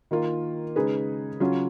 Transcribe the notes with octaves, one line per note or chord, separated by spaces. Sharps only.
D#3 A#3 F4
C#3 G#3 D#4 G#4 B4
C#3 F#3 C#4 F4